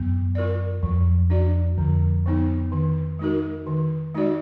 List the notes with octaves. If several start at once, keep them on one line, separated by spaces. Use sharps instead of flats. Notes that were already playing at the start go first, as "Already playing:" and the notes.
Already playing: F#2 B3
F4 A#4 D5
F2 F#3
D4 F#4 D5
F2 D3
F3 B3 D#4
D#3
G#3 D#4 F#4 A#4
D#3
G#3 D#4 F#4 D5